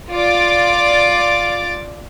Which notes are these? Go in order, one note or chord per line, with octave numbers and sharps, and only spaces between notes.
F4 D5 D6 A6